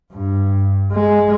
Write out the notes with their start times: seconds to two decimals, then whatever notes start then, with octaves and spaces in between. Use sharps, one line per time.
0.13 G2
0.92 G#3